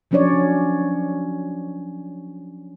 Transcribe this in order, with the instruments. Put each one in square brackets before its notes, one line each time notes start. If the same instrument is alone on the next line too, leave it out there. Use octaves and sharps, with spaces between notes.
[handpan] F3 F#3 C#4 D4 C#5 D5